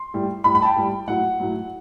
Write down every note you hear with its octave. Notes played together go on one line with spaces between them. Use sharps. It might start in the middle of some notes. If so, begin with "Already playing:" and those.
Already playing: C6
A2 G3
A2 G3 B5
B5
A5
G5
A2 G3
A2 F#3 F#5
A2 F#3